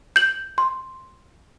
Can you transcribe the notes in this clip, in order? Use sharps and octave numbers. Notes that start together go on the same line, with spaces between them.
G6 F#7
C6